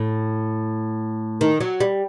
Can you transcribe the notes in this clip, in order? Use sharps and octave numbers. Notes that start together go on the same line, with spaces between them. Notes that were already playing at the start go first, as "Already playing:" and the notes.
Already playing: A2
D#3
F#3
G3